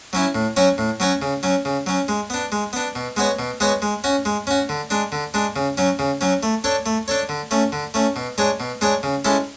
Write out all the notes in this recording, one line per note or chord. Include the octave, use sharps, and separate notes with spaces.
F#3 C#4 E4
A2
F#3 C#4 F#4 C#5
A2
F#3 C#4 F#4 C#5
C#3
F#3 C#4
C#3
F#3 C#4
G#3
B3 D4
G#3
B3 D4
B2
G#3 B3 F#4 C#5
B2
G#3 B3 F#4 C#5
G#3
C#4 F#4
G#3
C#4 F#4
D3
G#3 D4
D3
G#3 D4
C#3
F#3 C#4
C#3
F#3 C#4
A3
D4 A4 C#5
A3
D4 A4 C#5
D3
A3 C#4
D3
A3 C#4
B2
G#3 D4 G#4 C#5
B2
G#3 D4 G#4 C#5
C#3
G#3 C#4 E4 A4